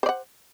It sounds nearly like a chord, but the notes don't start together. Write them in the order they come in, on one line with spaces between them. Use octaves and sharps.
C5 D5 F#5